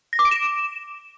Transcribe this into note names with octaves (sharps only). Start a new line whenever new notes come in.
A#6
D6
D7
E7